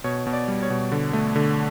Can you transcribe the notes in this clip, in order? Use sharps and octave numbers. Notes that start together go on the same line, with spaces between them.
B2 C#5
B2
D5
G3
C#5
B2
D3
A3
D3